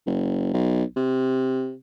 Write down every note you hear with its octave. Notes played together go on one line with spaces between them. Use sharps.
F#1
B1
C3